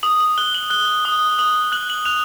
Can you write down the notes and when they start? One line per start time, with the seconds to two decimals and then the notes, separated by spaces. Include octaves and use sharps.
0.03 D#6 F#7
0.20 F#7
0.38 F#6 G7
0.55 F#7
0.70 F#6 G7
1.05 D#6
1.39 D#6 F#7
1.72 F#6 F#7
1.90 F#7
2.05 F#6 F7